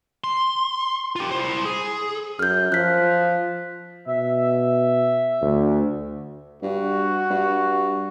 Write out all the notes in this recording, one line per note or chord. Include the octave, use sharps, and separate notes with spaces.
C6
F4 G4
E4 C5
G#4
F#2 F6 G6
F3 F#6 B6
B2 E5
D2
G2 F#4
G2